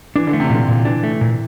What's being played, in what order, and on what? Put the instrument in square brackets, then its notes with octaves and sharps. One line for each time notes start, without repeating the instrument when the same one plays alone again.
[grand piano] E3 [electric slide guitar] D4
[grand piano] D3
[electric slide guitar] A3
[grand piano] C3
[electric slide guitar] A#2 [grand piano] D3
[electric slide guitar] A#2
[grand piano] E3 [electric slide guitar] D4
[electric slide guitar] A3
A#2